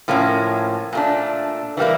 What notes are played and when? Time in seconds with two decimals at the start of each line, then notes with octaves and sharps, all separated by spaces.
0.08 A2 F3 A#3 C#4
0.93 A#2 A3 D4
1.77 E3 G3 A#3 E4